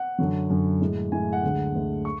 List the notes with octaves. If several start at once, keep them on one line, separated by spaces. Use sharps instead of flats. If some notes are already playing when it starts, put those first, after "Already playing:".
Already playing: F#5
F#2 D3 F#3
F#2 D3 F#3
A2 G#3
A2 G#3 G#5
F#5
D2 D3 G#3
D2 D3 G#3
C#6